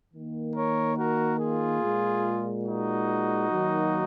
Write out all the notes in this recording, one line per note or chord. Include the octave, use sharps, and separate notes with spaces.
D#3 A#3
A#4 C#5
F#4 A#4
F4 G#4
A#2 G#3
D#4 F#4
D#3 F#3 A#3